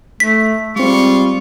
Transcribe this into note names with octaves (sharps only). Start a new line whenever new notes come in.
A3 B6
G3 G#3 C4 F4 C#6